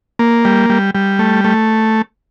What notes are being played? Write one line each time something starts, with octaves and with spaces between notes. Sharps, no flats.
A#3
G3
G3
G3
A3
A3